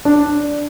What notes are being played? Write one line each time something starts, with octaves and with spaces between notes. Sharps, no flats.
D4